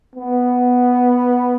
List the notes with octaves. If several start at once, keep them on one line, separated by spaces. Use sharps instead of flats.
B3